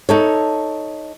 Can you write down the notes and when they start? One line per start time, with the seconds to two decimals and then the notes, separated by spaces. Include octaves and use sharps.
0.09 D#4 A4 C#5